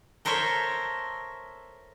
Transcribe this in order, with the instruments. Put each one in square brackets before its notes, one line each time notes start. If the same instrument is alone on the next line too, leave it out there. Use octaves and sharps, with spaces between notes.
[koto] A4 A#4 C5 C#5 E5